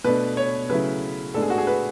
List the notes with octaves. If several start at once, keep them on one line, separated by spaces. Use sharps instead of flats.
B2 A3 D4 B4
C#5
C#3 F#3 A3 C#4 E4 B4
A2 G#3 B3 D4 A4
G#4
F#4
G#4
B4